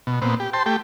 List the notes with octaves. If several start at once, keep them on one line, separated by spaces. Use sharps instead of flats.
B2
A#2 B3 C4
G4
C5 G5 A5 C6
A3 G4 G5